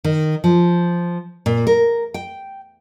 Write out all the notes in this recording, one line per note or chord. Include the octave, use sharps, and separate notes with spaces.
D#3
F3
A#2
A#4
G5